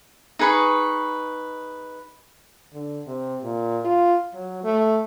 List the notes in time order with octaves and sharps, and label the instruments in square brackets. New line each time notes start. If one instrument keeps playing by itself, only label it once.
[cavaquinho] D#4 G#4 B4 C#6
[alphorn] D3
C3
A#2
F4
F#3
A3